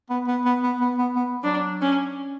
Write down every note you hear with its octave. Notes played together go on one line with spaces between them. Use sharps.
B3
B3
B3
B3
B3
B3
B3
F#3 D4
C#4